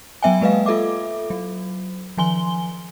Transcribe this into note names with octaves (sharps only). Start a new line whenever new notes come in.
F#3 B3 E5 G5 G#5
G#3 A#3 B4 D#5 F5
F4 A4 E5 D6
F#3
D#3 F3 G#5 C6 G7